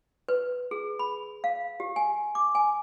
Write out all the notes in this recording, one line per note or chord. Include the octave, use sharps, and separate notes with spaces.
B4
G#4
B5
F5
G4
G#5
D6
G#5